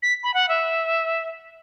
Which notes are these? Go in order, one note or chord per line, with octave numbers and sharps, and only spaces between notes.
B6
B5
F#5
E5